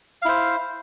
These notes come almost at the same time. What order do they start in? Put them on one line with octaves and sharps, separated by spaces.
F5 E4 C5